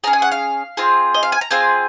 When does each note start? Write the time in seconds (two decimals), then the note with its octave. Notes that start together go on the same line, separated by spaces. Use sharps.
0.04 G#4 A#5
0.07 C#4
0.13 G#5
0.22 F#5
0.32 F5
0.77 C4 F4 G#4
1.14 D#5
1.23 F5
1.32 G#5
1.41 A#5
1.51 C4 F4 G#4 G#5